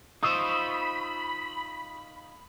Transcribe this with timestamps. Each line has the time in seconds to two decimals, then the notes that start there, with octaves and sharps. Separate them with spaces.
0.23 D#4 F4 C5 B5 C#6 D#6 E6